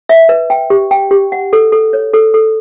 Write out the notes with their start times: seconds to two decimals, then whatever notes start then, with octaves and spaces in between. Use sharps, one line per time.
0.09 E5
0.29 B4
0.50 G5
0.70 G4
0.91 G5
1.11 G4
1.32 F#5
1.53 A4
1.72 A4
1.93 C#5
2.13 A4
2.34 A4